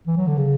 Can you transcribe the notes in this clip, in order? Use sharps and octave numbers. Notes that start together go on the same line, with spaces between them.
E3
F#3
D3
C#3